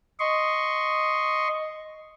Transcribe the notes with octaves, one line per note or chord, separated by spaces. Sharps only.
D#5 C6 C#6